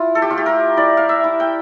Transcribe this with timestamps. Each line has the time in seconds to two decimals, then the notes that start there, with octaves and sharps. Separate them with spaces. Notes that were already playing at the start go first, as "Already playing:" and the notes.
Already playing: E4 F4
0.15 A4
0.22 G4
0.30 A3 F4
0.38 G4
0.46 A#4
0.77 E4 D5
0.97 F5
1.09 E5
1.24 E4
1.40 G5